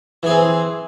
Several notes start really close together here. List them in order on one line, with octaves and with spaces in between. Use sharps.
E3 G#4 C4